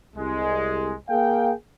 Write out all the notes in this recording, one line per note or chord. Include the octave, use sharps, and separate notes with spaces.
C2 G#3
A#3 G#4 F5 G5